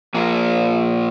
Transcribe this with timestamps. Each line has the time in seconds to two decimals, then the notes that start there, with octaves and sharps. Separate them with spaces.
0.14 A#2 F3 A#3